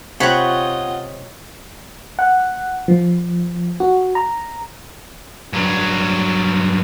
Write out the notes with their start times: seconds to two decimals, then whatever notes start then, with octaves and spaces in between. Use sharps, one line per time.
0.20 C3 F4 C#5 D#5 F#5 G5 B5
2.19 F#5
2.88 F3
3.80 F#4
4.15 A#5
5.53 G2 F#3